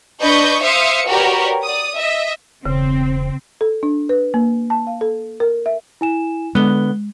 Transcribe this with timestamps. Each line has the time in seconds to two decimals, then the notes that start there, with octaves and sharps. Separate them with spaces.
0.21 D4 B4 D#5 C#6 G6
0.62 C5 E5 F5 D#6 C#7
1.07 F#4 G4 A#4 B4 C#5 D5
1.63 D5 D#6
1.96 D#5 E5
2.66 E1 C#3 C4
3.61 A4
3.83 D4
4.09 B4
4.34 A#3
4.70 A5
4.87 F5
5.01 A4
5.40 A#4
5.66 E5
6.01 E4 G#5 E7
6.55 D3 G#3 B3 F#6 G7